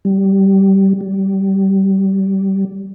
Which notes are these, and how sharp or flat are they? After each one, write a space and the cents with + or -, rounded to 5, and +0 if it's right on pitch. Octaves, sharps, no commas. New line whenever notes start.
G3 -15
G3 -20